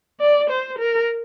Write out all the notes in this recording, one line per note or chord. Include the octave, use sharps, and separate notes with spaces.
D5
C5
A#4